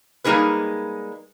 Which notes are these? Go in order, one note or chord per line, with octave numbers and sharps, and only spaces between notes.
G3 G#3 A#3 D#4 G#4 B4